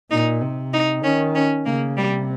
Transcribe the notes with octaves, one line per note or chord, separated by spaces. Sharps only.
A#2 D#4
C3
D#4
D#3 C#4
C#4
C#3 A#3
C3 G3